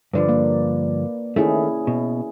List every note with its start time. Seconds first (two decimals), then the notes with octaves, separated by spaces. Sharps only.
0.13 G2 D3 F3 B4 D5
0.29 A#3
1.36 D#3 A3 C#4 E4 G#4
1.87 B2